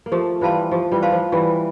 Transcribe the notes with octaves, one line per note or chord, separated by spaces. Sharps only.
A#3
F3 A3 G4
E3 G3 C5 F5 A5 C6
F3 G4
E3 G3
C5 F5 A5 C6
F3
E3 G3 G4